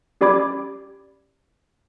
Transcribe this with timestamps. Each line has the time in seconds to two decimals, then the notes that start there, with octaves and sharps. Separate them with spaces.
0.21 C#4 G4 D5 B5 D6 G#6